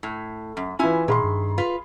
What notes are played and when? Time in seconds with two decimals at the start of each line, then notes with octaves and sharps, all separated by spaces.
0.03 A2
0.57 F#2
0.79 E3 C#4 E4 F4 G#5
1.08 A#2 D#3 G#4 B5 C6
1.24 G2
1.58 F4 B4